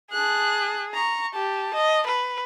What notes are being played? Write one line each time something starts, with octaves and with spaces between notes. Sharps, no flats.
G#4 A5 F#6
A#5 C#6
G4 A5
D#5
B4